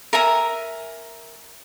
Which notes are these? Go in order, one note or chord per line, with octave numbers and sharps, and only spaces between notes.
A#4 E5 G#5 A#5